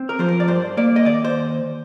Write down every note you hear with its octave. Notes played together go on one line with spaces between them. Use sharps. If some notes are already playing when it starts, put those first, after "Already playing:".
Already playing: C4
A#4
F3 C5
A#4
D5
G2 C5
A#3 D5
D#5
D#2 D5
C5